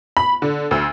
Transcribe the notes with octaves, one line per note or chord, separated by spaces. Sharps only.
B5
D3
D2 E6